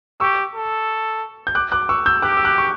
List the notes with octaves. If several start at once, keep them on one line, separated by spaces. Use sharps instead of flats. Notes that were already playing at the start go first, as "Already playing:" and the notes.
G4 C#6 E6
A4
G6
D6 F#6
D6 F#6
C#6 E6
E6 G6
G4 D6 F#6
E6
D6 F#6
C#6